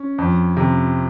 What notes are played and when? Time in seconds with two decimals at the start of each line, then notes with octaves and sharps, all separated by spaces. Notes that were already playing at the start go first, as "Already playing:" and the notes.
Already playing: C#4
0.18 F2
0.57 C3